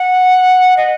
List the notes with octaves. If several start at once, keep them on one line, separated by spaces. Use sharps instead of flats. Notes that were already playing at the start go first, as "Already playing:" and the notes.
Already playing: F#5
D#5